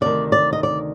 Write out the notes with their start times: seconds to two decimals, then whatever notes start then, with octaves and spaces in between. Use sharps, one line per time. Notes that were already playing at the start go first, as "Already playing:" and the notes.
0.01 D2 C3 D#3 D5
0.32 D5
0.53 D#5
0.63 D5